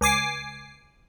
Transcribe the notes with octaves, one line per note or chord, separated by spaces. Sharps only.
C#2 G#5 D6 C7